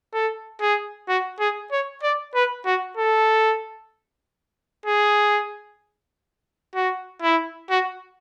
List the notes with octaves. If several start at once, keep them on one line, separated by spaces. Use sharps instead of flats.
A4
G#4
F#4
G#4
C#5
D5
B4
F#4
A4
G#4
F#4
E4
F#4